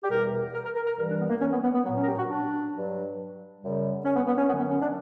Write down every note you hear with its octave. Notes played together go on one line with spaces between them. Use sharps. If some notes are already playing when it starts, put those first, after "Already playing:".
G4
E2 B2 G3 A#4
A#4
A#4
A#4
A#4
G2 E3 G3 A#4
D4
B3
A#3
C#4
B3
B3
B3
A#2 F#3 B3
C#4
A#4
G4
F#4
D4
G2 F#3
F#2 C#3 G3
C#4
B3
B3
C#4
F#2 D3 F#3 B3
B3
C#4
D4